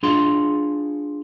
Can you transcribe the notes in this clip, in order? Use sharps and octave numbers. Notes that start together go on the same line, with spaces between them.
D4 F4 G#4 F5 F#5 C6